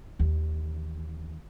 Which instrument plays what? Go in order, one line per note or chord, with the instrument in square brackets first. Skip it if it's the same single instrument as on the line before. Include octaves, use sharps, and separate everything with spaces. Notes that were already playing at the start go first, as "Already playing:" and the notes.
[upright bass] D#2 E3